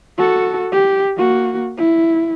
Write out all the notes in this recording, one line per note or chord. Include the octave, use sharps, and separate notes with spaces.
F#4 A4
G4
A#3 F#4
E4